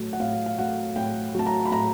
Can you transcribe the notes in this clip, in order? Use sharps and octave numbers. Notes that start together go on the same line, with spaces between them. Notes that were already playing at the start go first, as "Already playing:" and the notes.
Already playing: A2 F#3 A3
F#5
A2 F5
F5
F#3 A3 F#5
A2 G5
F#3 A3 A5
A#5
B5
A2 A#5